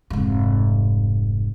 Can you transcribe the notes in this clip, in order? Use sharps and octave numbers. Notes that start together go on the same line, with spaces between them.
F1 G#2